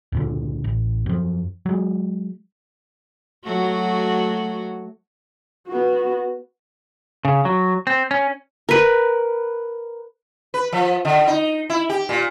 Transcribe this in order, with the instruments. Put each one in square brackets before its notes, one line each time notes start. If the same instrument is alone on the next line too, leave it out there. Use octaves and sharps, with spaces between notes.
[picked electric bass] C#2 A#2 D3
A1
F#2 F3
F#3 G#3
[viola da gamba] F#3 A3 F#4
[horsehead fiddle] B3 F#4
[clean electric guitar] C#3
F#3
C4
C#4
[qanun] A#4 B4
[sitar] B4
F3
D3
D#4
E4
G4
A#2